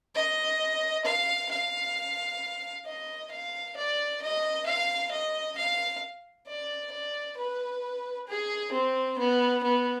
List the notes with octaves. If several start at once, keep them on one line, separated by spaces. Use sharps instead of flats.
D#5
F5
F5
D#5
F5
D5
D#5
F5
D#5
F5
D5
D5
B4
G#4
C4
B3
B3